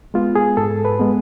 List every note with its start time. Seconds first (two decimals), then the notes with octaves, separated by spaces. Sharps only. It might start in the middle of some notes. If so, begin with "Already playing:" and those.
0.14 G#3 B3 F4
0.36 G#4
0.57 G#2 A4
0.85 B4
0.99 G#3 B3